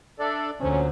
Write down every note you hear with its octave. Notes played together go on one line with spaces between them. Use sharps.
D4 A4 D5 E5
D2 A#2 D3 F#3 C#4 C5